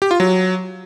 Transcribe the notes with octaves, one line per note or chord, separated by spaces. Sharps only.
G4
F4
F#3